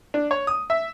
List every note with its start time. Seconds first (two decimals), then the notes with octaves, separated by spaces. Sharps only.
0.14 D4
0.31 C#5
0.47 D#6
0.70 E5